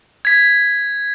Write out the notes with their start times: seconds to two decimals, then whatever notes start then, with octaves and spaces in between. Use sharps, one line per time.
0.25 G#6 B6